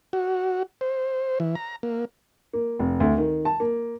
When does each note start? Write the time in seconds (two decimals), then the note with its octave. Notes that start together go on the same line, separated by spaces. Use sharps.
0.13 F#4
0.81 C5
1.40 E3
1.55 A#5
1.83 A#3
2.53 A#3
2.79 F1
3.00 D2
3.18 D#3
3.45 A5
3.60 A#3